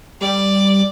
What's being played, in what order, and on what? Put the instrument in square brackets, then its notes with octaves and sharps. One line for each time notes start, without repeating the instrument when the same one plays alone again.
[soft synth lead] G3 [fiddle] D5